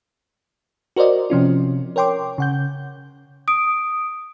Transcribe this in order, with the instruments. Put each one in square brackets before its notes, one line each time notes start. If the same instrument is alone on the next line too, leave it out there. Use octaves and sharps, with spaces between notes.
[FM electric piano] F#4 A#4 C5 D5 D#5
C3 F3 C#4 F4
A#4 C#5 G5 C6 D6
C#3 F#5 G6
[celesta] D#6 D7